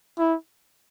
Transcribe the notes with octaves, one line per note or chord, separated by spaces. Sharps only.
E4